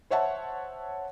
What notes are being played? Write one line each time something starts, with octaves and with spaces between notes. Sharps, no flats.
C5 C#5 E5 F#5 A5